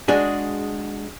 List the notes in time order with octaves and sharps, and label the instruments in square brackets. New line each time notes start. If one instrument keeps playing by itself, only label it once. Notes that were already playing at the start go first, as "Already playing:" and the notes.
[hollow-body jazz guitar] G#3 D4 F#4 G#4